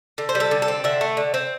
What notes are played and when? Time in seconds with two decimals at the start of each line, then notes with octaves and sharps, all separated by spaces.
0.18 D3
0.29 C5
0.35 G3
0.40 A4
0.51 D3
0.62 A4
0.68 C4
0.84 D3 E5
1.01 A3
1.17 D3
1.34 C4